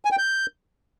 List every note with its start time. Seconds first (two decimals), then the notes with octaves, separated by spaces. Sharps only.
0.05 G#5
0.11 G5
0.18 G6